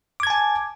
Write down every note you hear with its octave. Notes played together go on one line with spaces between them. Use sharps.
G#5 A5 D6 G#6